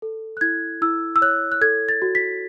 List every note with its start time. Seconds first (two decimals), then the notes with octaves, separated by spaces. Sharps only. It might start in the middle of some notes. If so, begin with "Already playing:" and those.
0.02 A4
0.37 F#6
0.41 E4 G#6
0.82 E4 E6
1.16 E6
1.22 C#5 F#6
1.52 F#6
1.61 A4 G#6
1.89 A6
2.02 F#4
2.15 B6